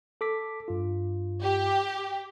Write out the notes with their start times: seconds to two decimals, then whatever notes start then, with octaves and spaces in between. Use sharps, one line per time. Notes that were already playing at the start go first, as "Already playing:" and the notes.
0.21 A4 D6 B6
0.68 G2 F4
1.43 G4